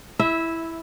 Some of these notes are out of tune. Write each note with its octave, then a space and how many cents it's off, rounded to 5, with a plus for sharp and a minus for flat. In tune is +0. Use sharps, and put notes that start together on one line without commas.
E4 +0 E5 -15